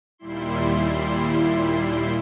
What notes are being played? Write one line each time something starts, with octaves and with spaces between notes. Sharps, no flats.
D#2 A#2 G3 E4 C6